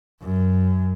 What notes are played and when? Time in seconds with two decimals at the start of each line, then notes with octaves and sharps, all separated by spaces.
0.22 F#2